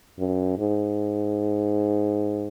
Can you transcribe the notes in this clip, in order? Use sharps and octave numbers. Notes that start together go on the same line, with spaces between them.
F#2
G#2